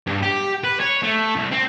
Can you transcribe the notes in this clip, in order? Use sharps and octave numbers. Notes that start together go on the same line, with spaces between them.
G2
G4
B4
C#5
A3
C2
C4